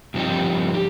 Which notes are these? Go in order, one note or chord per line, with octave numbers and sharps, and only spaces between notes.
G2 F3 C4 D#4 G4
G4